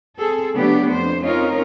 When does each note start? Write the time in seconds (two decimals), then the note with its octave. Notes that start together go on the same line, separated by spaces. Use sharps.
0.18 C4 G#4 A4
0.54 C#3 F#3 A3 B3 D4 G4
0.90 F2 C5
1.22 C4 C#4 D#4 F4 A#4